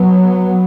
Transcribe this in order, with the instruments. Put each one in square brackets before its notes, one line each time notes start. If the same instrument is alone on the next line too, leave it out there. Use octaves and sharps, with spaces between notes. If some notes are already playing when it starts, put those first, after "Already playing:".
Already playing: [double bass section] F#3 B3